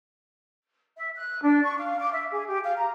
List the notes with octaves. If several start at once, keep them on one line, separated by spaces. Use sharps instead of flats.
E5
F#6
D4
C#6
F5
D6
E5
G#4
G4
F5
A#5